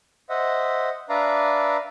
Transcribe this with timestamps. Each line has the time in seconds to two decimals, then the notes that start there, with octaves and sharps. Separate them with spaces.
0.30 C5 D#5 E5 F#5
1.09 D4 B4 D5 E5 F5 A#5